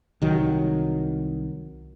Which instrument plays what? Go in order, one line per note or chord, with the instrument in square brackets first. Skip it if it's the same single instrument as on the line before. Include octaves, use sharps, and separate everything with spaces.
[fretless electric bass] C2 D#3 F#3